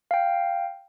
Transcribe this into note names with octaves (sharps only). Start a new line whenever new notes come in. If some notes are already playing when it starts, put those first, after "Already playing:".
F5 G5